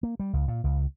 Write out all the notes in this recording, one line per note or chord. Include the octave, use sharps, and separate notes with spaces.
A#3
G3
C#2
A#2
C#2